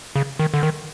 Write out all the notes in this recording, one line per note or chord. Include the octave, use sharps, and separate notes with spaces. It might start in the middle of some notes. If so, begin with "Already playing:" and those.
C#3
D#3
D3
D#3